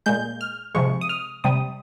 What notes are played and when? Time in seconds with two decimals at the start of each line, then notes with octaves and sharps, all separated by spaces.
0.06 A#2 G#3 G6
0.41 F6
0.75 C3 F3 G#3 C#6
1.01 D#6
1.09 F6
1.44 C3 G3 D#6